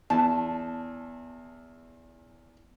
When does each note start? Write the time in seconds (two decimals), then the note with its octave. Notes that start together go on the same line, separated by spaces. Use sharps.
0.10 E2 A5